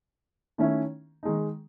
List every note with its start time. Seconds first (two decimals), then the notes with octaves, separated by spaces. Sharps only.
0.58 D#3 A3 C#4 E4
1.23 D#3 G#3 D#4